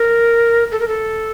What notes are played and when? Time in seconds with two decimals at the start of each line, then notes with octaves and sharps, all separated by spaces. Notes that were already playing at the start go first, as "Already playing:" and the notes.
Already playing: A#4
0.72 A4
0.80 A#4
0.88 A4